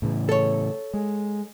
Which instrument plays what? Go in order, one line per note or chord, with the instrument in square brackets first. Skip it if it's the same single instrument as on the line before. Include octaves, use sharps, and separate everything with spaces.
[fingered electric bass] A2 C#3 E3
[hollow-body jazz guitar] A4 C#5
[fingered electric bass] G#3